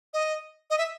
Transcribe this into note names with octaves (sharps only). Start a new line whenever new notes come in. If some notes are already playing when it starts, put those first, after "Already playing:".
D#5
D#5
E5